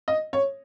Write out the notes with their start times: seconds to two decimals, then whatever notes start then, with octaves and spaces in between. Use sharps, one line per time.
0.08 D#5
0.33 C#5